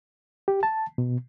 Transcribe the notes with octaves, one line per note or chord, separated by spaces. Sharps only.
G4
A5
B2